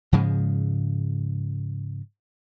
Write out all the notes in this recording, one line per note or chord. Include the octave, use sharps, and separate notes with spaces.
G#2 C#3 F3 G#3